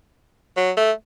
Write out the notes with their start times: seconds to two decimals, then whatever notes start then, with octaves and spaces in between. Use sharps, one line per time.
0.57 F#3
0.77 A3